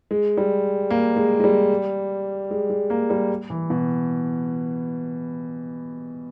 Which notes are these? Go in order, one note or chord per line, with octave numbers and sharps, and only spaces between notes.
G#3
G3
A#3
G#3
G#3
G3
G#3
G#3
A#3
G3
E3
B2